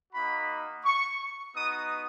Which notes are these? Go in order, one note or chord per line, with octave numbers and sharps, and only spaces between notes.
A#3 D#4 F#4 B5
C#6
B3 D#4 F#4 D#6